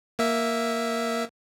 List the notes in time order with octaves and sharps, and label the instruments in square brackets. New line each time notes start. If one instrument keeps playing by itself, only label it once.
[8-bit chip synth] A#3 E5